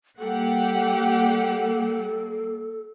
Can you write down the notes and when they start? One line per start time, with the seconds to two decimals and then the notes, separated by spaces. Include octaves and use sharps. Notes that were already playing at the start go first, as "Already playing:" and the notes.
0.19 G3 A#3 G4 A4 F#5